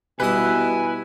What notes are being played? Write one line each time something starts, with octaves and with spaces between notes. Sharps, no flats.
B2 G3 E4 B4 G#5 D#6